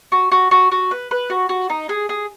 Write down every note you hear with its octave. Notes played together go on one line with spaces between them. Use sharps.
F#4
F#4
F#4
F#4
B4
B4
F#4
F#4
D#4
G#4
G#4